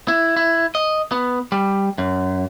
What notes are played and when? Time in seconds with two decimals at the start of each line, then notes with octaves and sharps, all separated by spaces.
0.08 E4
0.37 E4
0.75 D#5
1.12 B3
1.52 G3
1.98 F#2